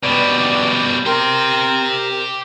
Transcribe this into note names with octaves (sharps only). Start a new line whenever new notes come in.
B2 G3 B4 D5
G4 A#4 G5 C6